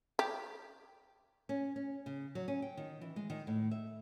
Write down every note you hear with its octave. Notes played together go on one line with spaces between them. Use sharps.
G4
C#4
C#4
C#3
F#3
C#4
G5
D#3
E3
G#3
D#3
A2
E5